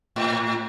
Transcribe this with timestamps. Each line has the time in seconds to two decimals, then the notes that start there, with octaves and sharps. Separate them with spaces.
0.16 A2